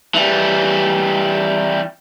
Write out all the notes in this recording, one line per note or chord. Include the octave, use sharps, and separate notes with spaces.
E3 G3